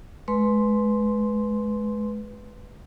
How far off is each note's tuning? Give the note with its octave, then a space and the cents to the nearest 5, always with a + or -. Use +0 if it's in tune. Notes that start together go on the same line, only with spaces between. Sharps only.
G#3 +35 B4 +0 C6 +0